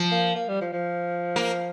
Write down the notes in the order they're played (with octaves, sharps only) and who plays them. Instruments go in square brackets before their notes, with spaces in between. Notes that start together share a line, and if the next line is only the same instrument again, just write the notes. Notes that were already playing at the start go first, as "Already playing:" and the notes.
Already playing: [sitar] F3
[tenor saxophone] A#3
A#3
G3
F3
F3
[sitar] A#3